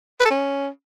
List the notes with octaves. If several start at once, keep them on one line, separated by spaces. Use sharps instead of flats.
B4
A4
C#4